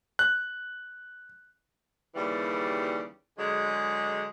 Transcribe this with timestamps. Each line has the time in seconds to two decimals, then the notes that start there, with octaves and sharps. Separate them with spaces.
0.19 F#6
2.15 D#2 C#3 E3 G3
3.38 D3 F#3 G#3